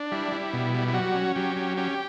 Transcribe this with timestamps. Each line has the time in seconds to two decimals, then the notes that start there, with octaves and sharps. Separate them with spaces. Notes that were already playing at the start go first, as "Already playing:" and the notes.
Already playing: D4
0.11 G3 E4
0.32 G3
0.53 B2
0.74 G3
0.88 E4
0.94 F#3 F#4
1.15 C#4
1.36 F#3 G4
1.56 C#4
1.77 C#4 G4